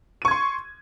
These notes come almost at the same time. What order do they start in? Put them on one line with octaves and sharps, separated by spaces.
D#7 C#6 G#6 C6